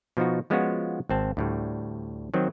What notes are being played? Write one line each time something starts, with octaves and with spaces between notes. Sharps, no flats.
B2 F3 B3 D#4 F#4
F3 G#3 B3 C#4 F4 F#4
G#1 C4 A5
D2 A2 G3
D#3 F#3 C4